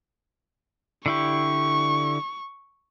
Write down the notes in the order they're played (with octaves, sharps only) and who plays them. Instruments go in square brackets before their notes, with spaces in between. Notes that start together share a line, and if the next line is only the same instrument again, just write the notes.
[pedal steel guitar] D3 E4 G4 [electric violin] C#6